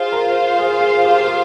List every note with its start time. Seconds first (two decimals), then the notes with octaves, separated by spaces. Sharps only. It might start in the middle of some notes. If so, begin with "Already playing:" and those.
Already playing: F4 G#4 C5 F5
0.12 A#4
0.59 G#4
0.81 G#4
1.05 G4
1.28 G#4